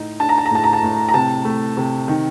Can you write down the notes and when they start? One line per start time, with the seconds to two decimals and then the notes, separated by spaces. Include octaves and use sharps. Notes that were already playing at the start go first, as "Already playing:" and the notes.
Already playing: A2 D#4
0.20 D4 A5
0.29 A#5
0.38 A5
0.46 A#5
0.51 A2 A5
0.64 A#5
0.73 A5
0.83 A2
1.09 A#5
1.14 C3 A5
1.45 A3
1.77 C3
2.08 D#3